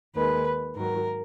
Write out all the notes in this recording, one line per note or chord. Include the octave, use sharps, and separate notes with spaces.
D#2 D#3 G#3 B4
G#2 D#3 F#3 A#4